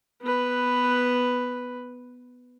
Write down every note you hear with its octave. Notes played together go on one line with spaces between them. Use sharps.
B3 B4